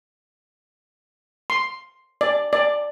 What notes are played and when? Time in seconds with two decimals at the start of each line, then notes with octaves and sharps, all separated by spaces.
1.50 C6
2.21 D5
2.53 D5